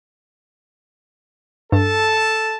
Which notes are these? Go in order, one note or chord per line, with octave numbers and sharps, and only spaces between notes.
G2 A4 A5